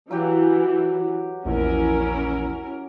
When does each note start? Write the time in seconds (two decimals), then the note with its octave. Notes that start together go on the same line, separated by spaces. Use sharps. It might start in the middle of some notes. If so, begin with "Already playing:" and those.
0.11 E3 F#3 F#4 G4
1.45 A#1 E2 C#4 E4 A#4